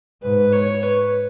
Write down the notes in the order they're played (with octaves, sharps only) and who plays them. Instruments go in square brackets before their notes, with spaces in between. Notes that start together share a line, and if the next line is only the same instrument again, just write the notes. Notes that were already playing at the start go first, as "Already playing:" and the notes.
[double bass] G#2 [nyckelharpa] B4
[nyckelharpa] C#5
B4